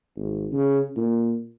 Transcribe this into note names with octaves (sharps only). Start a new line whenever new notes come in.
G#1
C#3
A#2